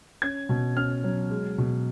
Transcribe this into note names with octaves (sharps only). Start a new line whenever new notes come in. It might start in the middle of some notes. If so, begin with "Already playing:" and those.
C#4 G#6
B2
C#4 F6
F#3
G#3
B2